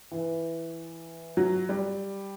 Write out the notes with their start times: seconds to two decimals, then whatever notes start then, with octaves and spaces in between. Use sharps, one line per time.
0.11 E3
1.37 F#3
1.69 G3